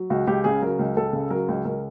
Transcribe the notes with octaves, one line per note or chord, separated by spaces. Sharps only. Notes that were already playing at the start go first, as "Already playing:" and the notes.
Already playing: F#3
C#2 F#4
C#2 G4
C#3 G#4
F#3 A#4
C#2
C#2 A4
C#3
F#3 A#4
C#2
C#2 A#4